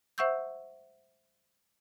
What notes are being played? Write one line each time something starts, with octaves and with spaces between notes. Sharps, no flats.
C5 E5 F#5 C#6 E6 G6